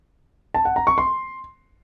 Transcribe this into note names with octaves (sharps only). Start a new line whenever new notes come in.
A5
F#5
A#5
C#6
C6